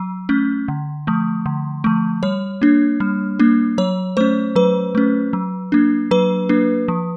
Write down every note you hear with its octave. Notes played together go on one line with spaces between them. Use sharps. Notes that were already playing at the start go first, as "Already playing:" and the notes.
Already playing: F#3
A3 C#4
D3
F3 A3
D3
F3 A3
G3 C#5
A#3 D4
G3
A#3 D4
F#3 C#5
A3 C#4 C5
F#3 B4
A3 C#4
F#3
A#3 D4
F#3 B4
A#3 D4
F3